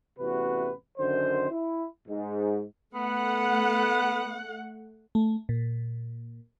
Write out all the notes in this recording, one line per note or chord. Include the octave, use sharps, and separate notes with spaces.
A1 E2 C3 F#4 B4
F#2 D3 D#3 C5
E4
G#2
A3 B3 F#5
A3
A#2